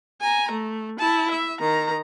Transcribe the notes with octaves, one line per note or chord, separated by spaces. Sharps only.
G#5 A#5
A3
E4 A5
E5
D#3 A#5